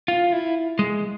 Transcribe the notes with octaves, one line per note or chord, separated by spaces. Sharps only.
F4
E4
G#3